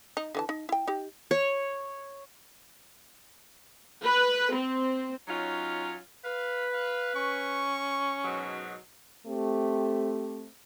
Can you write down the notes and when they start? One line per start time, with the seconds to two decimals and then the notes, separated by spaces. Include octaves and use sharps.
0.17 D#4
0.35 D3 E3 A5
0.49 D#4
0.69 E4 G5
0.88 D#4 G4
1.31 C#5
4.04 B4
4.54 C4
5.28 F#3 C#4 D#4 F4
6.25 B4 F5
6.73 F5
7.15 C#4 C#6
8.25 G#2 B2 F#3
9.26 A3 C4 G4